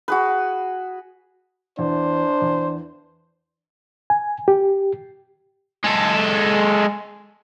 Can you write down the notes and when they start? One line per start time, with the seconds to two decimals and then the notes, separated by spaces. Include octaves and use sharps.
0.08 F#4 G#4 B4
1.79 E2 D4 C5
2.42 E2
4.10 G#5
4.48 G4
5.84 G#3 A4